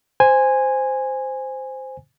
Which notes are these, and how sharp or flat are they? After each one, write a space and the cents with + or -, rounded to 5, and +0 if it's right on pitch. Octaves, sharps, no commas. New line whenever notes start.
C5 -5 G#5 -10